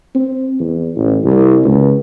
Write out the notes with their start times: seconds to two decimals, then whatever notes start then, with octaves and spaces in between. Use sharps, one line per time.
0.15 C4
0.60 E2
0.96 A1
1.25 C2
1.64 C#2